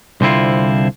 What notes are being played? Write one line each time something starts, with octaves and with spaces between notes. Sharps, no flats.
C2 D3 C4 E4 F4